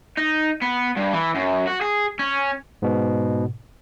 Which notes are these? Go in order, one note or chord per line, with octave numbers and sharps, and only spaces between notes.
D#4
B3
G2
E3
F#2
F#4
G#4
C#4
G#2 B2